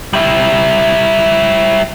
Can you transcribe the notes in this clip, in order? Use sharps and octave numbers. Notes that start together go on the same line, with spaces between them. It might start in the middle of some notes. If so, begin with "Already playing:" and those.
G3 E4